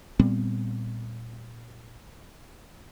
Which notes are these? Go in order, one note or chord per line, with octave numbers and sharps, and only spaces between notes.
A#2 G3 B3 C4